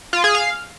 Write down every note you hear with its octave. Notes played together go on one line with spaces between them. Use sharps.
F4
G#4
F5